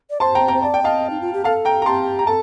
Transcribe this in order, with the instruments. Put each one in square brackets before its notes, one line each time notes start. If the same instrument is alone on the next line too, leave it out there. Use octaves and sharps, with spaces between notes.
[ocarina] D5
[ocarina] C5 [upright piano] A5 C6
[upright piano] G5 A#5
G5 A#5
[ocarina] C5
[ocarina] D5 [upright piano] A5
[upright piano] G5
[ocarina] D#5 [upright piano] F5 A5
[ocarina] D#4
F4
G4
[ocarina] A4 [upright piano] F5 A5
[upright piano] G5 A#5
A#5
[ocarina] G4 [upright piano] A5 C6
[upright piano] A#5
[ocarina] A4 [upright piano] A5